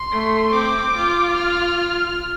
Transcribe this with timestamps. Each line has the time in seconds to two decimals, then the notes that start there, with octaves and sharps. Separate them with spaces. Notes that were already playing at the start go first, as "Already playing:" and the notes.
Already playing: C6
0.12 A3
0.53 C4 D6
0.96 F4
1.37 F6